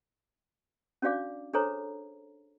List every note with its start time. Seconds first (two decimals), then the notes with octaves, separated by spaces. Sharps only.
1.02 C#4 D4 F#4 D5 F5 D6
1.53 D4 G#4 A4 C5 C#5 A#5